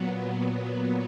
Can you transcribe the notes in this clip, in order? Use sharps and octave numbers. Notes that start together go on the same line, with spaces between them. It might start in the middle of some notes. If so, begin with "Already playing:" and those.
Already playing: A#2 F#3 B3